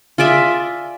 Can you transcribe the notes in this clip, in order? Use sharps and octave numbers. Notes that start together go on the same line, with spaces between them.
F4 G#4 D5 E5